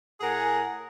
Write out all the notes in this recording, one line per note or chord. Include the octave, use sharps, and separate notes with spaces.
A2 G#4 A#4 F#5 G#5